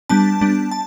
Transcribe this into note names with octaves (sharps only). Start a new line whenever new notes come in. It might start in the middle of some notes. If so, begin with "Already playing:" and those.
G3 B3 D4 A5
G3 B3 D4
A5